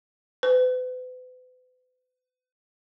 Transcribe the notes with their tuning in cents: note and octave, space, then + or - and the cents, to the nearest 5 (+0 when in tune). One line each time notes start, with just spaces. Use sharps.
B4 +40